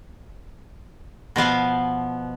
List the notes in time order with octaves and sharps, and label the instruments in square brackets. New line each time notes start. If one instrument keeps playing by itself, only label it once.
[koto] B2 F3 B3 F5